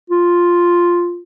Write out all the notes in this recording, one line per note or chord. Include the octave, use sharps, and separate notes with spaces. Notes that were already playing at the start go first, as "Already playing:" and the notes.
F4